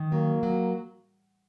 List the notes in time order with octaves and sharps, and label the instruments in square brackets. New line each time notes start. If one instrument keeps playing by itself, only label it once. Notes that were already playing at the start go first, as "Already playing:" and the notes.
Already playing: [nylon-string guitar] D#3
[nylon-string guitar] F#3 [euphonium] A#3
[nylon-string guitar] F#3